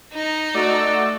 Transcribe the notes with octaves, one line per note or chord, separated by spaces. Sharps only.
D#4 A#5
A3 F#4 D5 E6